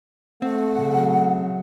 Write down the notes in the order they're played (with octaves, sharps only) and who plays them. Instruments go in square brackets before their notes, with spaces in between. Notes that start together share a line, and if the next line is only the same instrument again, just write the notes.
[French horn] A3 [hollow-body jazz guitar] C4 [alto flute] F#5
[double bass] C#3 F#3